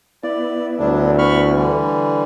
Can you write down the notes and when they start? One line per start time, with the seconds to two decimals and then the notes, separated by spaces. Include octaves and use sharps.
0.23 B3 E4 D5
0.79 D2 F#3 G3 D4
1.18 B5 C#6 F6
1.55 D3 E3 G3